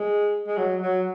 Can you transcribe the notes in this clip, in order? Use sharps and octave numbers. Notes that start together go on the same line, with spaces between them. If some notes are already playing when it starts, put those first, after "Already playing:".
Already playing: G#3
G#3
F#3
F#3